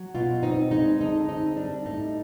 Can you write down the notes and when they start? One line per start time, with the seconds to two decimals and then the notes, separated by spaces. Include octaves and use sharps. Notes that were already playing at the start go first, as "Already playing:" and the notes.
Already playing: F#3
0.15 B2 F4
0.43 C4 D#4
0.71 G#3 D#4
1.00 D3 D#4
1.28 C4 D#4
1.57 G3 D4
1.86 A2 D#4